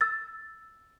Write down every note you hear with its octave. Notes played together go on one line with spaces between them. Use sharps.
E6 A6